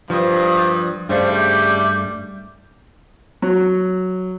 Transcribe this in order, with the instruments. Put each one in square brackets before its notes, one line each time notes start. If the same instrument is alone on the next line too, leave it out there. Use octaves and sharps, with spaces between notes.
[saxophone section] G2 [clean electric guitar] F3 [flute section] C5 D5 D#6
[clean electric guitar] G2 A3 [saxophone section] C#3 G3 [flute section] C5 F5 C6
[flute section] E5 D6 G6
[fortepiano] F#3